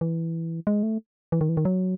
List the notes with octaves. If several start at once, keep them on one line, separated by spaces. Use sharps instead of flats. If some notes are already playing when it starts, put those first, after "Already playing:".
E3
G#3
A3
E3
D#3
E3
D#3
F#3